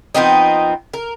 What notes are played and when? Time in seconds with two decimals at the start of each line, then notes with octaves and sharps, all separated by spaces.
0.15 F3 B3 C4 D#4
0.94 A#4